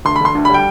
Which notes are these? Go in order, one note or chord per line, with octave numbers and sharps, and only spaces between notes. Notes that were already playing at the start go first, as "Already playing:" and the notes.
D2 C6
B5
D3 C6
D2
B5
G3 G5